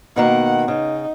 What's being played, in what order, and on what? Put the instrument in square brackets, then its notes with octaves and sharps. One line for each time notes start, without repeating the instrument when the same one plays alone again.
[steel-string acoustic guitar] B2 D#3 A#3 [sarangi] F#5
[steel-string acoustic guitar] C#3 [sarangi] D#4